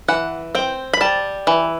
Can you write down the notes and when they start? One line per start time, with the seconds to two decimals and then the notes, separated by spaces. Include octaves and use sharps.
0.08 E3 F#5
0.55 C4 G5
0.94 B5
1.01 G3 A5
1.47 E3